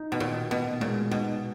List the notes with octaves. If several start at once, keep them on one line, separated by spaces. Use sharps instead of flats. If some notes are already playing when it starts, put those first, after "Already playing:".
Already playing: D#4
B2
A#2 D#3
B2 B3
A#2 G#3
B2 D#4